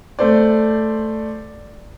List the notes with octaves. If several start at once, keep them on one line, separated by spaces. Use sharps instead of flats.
A3 C5 D5